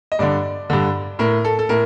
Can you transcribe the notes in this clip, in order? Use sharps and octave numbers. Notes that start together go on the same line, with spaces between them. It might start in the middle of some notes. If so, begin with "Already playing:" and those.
D#5
G2 D3 D5
G2 D3
A2 A#4
A4
A4
A2 A#4